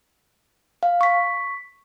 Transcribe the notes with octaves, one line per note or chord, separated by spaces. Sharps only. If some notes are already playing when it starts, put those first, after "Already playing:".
F5
C#6 B6